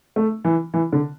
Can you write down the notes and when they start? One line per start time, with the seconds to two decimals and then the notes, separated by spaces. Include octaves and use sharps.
0.16 A3
0.45 E3
0.74 E3
0.93 D3